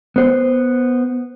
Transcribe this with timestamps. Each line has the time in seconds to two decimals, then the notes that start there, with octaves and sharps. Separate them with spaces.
0.16 B3 C5